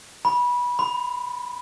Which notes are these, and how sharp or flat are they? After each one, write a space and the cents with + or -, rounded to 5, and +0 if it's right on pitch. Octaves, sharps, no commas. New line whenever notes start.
B5 -20
B5 +35